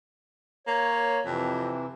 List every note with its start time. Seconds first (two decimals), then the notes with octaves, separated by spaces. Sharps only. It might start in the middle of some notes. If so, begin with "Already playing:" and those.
0.67 A#3 C#5
1.26 F2 C3 E3